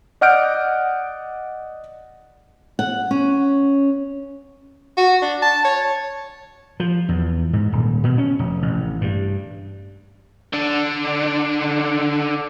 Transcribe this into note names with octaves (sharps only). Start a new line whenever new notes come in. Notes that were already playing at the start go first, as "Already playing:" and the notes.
D5 D#5 F#5 F6 G6 D7
F#5
C#4
F#4
D4
A5
C#5
F3
E2
G#2
D#1
B2
C#4
F1
A1
G2
D3 D4